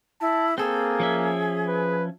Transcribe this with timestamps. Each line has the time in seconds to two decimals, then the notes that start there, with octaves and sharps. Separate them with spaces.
0.21 E4 A5
0.58 A#3 C4 G#4 A4
1.00 F3 C#4 E5
1.68 B4